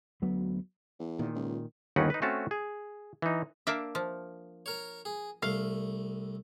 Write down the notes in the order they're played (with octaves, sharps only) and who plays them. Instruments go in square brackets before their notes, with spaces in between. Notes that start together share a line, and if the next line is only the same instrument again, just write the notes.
[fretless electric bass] D2 F#3 B3
[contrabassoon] E2
[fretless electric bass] A#2 D#3
[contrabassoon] C#2
[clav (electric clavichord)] G1 D#2 C#4 D#4 B4 F#5
D#4 B4
A3 C4 C#4 F#4 A5
G#4
E3 D#4
[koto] A#3 D4 E5
F3
[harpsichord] A#4 C#5
G#4
[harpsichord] C2 A3 [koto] F5